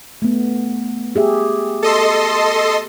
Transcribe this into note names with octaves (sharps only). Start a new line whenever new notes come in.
A3 B3
G4 G#4 E5
A4 D#5 C6